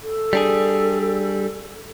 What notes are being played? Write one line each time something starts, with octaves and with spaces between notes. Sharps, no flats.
A4
G3 D4 G#4